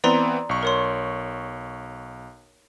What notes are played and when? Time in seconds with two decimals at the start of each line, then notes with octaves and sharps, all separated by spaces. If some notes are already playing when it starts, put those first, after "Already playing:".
0.04 E3 B3 C4 D5 A#5 C6
0.49 B1 C#6
0.63 A#4 C#5 C6